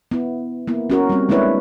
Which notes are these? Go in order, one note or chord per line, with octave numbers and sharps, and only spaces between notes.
B3 E4
A#3 B3 E4
C#4 F#4 A#4
G3 C4
G#3 A#3 D4 E4 B4 C#5